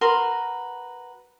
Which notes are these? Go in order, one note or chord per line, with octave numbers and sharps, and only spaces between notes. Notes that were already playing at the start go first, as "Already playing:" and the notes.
F#4 A#4 B4 C6